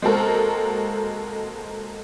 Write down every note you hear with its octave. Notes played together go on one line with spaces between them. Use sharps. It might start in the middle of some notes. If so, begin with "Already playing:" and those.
G#3 A#3 C4 F#4 A4 A#4